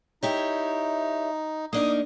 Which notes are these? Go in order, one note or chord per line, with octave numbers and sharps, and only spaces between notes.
D#4 E4 G4 C#5
A#3 D4 D#4 D#6